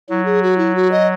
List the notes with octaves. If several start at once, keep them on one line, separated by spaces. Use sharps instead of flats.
F#3 E4
G#4
F#4
E4
F#4
D#5